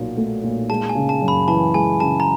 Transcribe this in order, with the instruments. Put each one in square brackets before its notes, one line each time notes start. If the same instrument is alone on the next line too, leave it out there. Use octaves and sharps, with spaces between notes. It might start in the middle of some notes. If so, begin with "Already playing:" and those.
Already playing: [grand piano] B1 A#2 F#3
A3
A#2
[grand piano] G#3 [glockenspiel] A5
[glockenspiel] G#5
[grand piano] C#3
[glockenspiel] A5
[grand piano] F#2
[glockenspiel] B5
[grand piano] E3 [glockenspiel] A5
[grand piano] G#3 [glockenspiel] G#5
[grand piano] C#3 [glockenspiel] A5
[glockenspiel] A#5